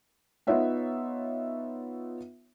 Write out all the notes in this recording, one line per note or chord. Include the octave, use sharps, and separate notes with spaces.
B3 D#4 F4 C#5 E5 F#5